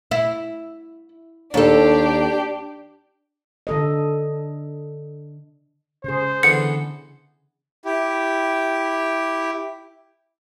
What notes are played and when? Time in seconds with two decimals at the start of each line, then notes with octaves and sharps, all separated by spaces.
0.11 E4
1.54 D#2 D4 G4 A4
3.67 D3 A4 D#5
6.04 C#3 G#4 C5
6.43 D3 E3 B3 C#7
7.85 E4 G4